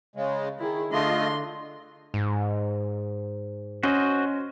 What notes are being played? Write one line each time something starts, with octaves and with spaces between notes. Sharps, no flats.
C#3 G#3
D#3 E4 G#4
D3 A3 F4 D#5 C6
G#2
C#4 F#4 C5 D#5